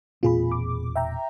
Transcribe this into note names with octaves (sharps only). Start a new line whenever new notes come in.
E1 A#2 C4 F4 G#4 B5
D6
E5 G5 A#5